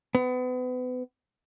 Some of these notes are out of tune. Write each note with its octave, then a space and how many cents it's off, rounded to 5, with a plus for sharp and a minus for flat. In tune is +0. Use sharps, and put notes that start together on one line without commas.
B3 +35